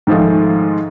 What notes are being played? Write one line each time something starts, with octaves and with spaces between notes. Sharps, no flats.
G#2 D#3 F3 G#3 A3